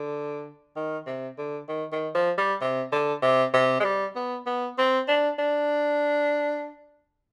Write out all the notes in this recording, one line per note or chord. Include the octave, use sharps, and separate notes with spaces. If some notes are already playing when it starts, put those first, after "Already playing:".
Already playing: D3
D#3
C3
D3
D#3
D#3
F3
G3
C3
D3
C3
C3
G#3
G3
B3
B3
C4
D4
D4